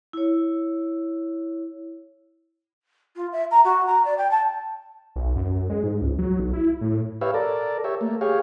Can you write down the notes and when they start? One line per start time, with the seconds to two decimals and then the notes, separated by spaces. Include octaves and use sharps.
0.13 E4 C#5
3.16 F4
3.33 E5
3.51 A#5
3.65 F#4
3.87 A#5
4.05 D5
4.18 G5
4.31 A5
5.16 B1
5.36 F#2
5.50 F#2
5.70 G#3
5.84 G#2
6.02 C#2
6.19 F#3
6.40 B1
6.53 E4
6.81 A2
7.21 G4 B4 C#5 E5 F5
7.34 A4 A#4 D5
7.84 G4 C#5 E5
8.01 A3 A#3
8.21 G4 G#4 C#5 F5